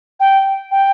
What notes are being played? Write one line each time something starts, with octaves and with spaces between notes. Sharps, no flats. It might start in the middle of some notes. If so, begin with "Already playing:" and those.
G5
G5